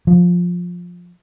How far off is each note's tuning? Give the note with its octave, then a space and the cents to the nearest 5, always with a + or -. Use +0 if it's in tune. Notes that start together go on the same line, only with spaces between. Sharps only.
F3 +15